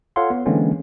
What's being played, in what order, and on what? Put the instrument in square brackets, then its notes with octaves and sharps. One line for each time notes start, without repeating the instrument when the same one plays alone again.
[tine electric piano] F4 A4 C#5 F5 F#5 C6
B3
D3 E3 G#3 A#3 C4 C#4